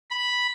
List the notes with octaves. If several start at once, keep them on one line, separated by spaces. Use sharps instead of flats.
B5